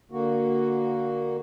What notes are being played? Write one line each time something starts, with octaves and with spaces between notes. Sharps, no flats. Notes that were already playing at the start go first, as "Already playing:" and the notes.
D3 A#3 F#4